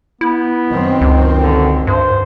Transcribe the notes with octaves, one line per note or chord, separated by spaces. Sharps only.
B3 E4
F#2 D#3 C4
C#2
D3
G2 C5